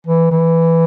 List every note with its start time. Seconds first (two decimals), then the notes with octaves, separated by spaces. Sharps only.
0.07 E3
0.32 E3